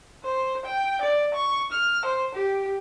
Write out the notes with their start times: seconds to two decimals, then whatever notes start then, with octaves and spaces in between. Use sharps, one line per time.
0.24 C5
0.66 G5
1.01 D5
1.34 C#6
1.72 F6
2.05 C5
2.35 G4